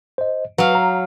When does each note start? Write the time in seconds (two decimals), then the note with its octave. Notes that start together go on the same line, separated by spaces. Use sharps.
0.18 C5 D#5
0.58 F#3 B4 F5
0.75 A#5